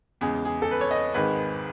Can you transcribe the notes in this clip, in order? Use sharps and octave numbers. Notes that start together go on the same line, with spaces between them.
E2 C#3 G#3 G#4
G#4
A4
B4
C#5
D#5
G#1 G#2 D#3 G#3 B4